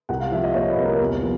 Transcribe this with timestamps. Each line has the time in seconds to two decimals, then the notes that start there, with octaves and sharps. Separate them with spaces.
0.09 C2 F#5
0.20 F5
0.32 F3 E5
0.44 D#5
0.54 A#2 C#5
0.70 B4
0.77 C2
0.85 A#4
1.00 E2
1.22 F3